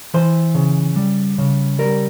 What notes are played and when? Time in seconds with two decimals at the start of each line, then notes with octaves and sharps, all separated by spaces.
0.14 E3 C5
0.55 C#3
0.96 G3
1.38 C#3
1.79 G3 A#4